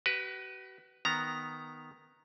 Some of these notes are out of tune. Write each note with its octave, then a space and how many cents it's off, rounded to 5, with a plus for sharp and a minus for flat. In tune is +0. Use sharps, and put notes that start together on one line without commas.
F#4 +45 B4 +0
D#3 +0 B3 +0 A#5 -5